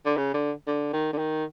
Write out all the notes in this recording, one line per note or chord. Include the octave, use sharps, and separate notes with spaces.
D3
C#3
D3
D3
D#3
D3
D#3